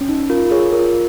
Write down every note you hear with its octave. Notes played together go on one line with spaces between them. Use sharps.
C#4
D#4
F4 A#4
G#4 C#5
F4 A#4